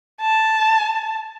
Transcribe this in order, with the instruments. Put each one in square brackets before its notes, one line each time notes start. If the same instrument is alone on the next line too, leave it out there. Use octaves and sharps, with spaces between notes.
[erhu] A5